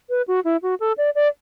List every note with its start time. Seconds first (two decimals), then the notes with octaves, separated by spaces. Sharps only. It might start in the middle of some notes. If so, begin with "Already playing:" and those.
0.10 B4
0.28 F#4
0.44 E4
0.62 F#4
0.80 A4
0.98 D5
1.15 D5